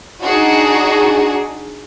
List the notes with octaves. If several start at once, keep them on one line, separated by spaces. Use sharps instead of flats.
D4 D#4 F#4 G#4